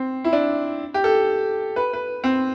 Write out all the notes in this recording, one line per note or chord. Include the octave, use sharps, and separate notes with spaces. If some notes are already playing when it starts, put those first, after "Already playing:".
Already playing: C4
E4
D4
G4
A4
B4
B4
C4